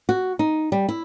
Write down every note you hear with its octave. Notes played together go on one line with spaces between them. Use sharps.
F#4
D#4
G3
E4